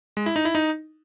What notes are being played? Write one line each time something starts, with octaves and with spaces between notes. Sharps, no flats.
G#3
E4
D#4
E4
D#4